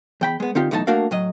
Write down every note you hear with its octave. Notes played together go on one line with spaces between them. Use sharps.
E2 G5 B5
G#3 B3
D3 C4 D#4 F4 G4
B1 E3 A3 D#4 D#5 A5
A3 A#3 D4 F#4 A#4 F5
A2 F#3 D#5